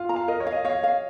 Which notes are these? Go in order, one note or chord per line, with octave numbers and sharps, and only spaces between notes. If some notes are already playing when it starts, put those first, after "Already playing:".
Already playing: F4 F5
A#5
F5
A#4 D#5
C#5
F5
D#5
C#5 F5
F5